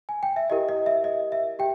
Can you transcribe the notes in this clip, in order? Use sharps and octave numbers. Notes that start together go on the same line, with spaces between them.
G#5
G5
E5
E4 G4 A#4 D#5
D#5
E5
D#5
E5
G4 G5